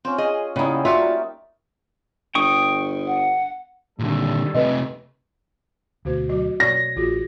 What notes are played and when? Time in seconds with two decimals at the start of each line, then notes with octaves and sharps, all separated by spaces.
0.05 C4 C#4 F4
0.18 G#4 D#5
0.56 C#3 G3 A#3 B3 D#4 E4
0.85 F4 F#4 D5 E5
1.02 A#4
2.35 G1 G5 C#6 D#6
3.06 F#5
3.99 A#2 D3 D#3 G3 A4
4.55 C3 A3 B4 D#5
6.05 D2 B2 A3 F#4 C5
6.29 F#3 F#4 D#5
6.60 B2 C#5 D5 C#6 A#6
6.96 A1 F4 F#4 G#4